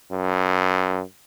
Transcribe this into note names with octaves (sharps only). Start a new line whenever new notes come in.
F#2